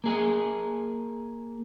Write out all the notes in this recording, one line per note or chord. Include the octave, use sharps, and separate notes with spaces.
A#3 G#4 G#5